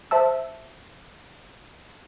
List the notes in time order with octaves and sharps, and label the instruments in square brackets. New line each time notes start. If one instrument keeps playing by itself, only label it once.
[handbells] C5 E5 A5 E6